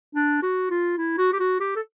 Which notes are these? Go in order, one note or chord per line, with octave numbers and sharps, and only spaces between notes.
D4
F#4
F4
E4
F#4
G4
F#4
G4
A4